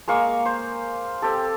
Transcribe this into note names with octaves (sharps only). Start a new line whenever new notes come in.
G#3 A#3 F5 C#6
C5
C4 G4 A4